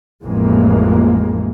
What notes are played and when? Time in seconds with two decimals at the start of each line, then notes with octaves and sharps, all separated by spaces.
0.24 A1 F2 E3 G#3 A#3